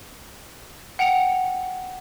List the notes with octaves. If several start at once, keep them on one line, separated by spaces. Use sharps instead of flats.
F#5 G5 C#7 F7